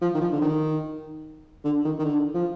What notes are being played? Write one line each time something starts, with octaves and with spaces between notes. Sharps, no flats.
F3
D#3
F3
D3
D#3
D3
D#3
D#3
D3
F3